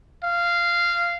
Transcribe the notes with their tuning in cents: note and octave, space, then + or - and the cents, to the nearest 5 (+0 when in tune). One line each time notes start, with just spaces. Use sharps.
F5 -15